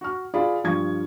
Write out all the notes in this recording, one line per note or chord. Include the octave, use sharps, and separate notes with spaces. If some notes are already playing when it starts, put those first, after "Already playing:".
F#4 F6
F4 G#4 D5 F5 B5
G2 F3 G3 C#6 G#6